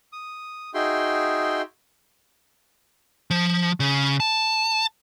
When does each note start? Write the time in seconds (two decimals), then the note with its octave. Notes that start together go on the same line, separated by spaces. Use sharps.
0.13 D#6
0.74 D#4 F#4 G#4 E5 G5 C6
3.31 F3
3.80 C#3
4.20 A5